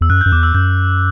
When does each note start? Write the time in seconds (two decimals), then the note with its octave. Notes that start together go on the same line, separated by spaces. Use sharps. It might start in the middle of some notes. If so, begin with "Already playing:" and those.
0.01 E2 E6
0.09 F#2 F#6
0.21 F#2 G6
0.32 E2 D6
0.43 E6
0.54 F#2 G6